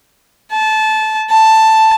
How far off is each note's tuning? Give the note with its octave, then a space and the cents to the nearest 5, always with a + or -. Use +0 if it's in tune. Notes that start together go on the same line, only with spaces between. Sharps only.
A5 -20
A5 +5